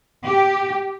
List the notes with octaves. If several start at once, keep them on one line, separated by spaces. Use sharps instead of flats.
G4